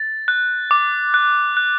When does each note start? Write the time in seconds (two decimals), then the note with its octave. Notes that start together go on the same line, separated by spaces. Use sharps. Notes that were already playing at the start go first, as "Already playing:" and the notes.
Already playing: A6
0.28 F#6
0.71 D6
1.14 F#6
1.57 F#6